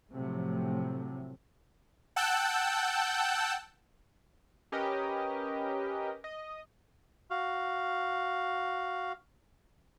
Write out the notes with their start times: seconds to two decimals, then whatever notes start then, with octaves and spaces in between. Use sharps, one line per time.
0.14 A2 C3 F3 F#3 A3
2.16 F#5 G5 A5 E6 F#6 G6
4.72 C#4 G4 A#4 B4 D#5
6.24 D#5
7.31 F#4 F5